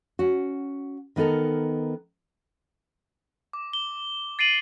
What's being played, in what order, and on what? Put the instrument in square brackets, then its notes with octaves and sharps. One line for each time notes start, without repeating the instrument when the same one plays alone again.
[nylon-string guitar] C#4 F#4
D#3 B3 D#4 A4 A#4
[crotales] D6
G7
A6 C7 D7 D#7 F#7